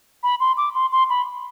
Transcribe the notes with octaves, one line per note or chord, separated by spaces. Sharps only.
B5
C6
D6
C6
C6
B5